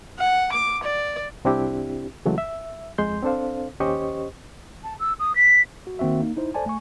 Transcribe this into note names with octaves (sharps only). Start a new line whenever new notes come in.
F#5
D6
D5
C2 C4 D4 E4 G4
C#3 E3 F#3 G#3 A3
E5
F2 G#3 C6 G6
C4 D4 A4 C5 F5
D#2 C#4 G4 C5 D#5 C#6
A5
E6
D#6
B6
F#4
D#3 A#3 C4 F#4 E5
A#3 D#4
D#4 E4 C5
A4 C5 D5 G#5 A5
A3 G#5 C#6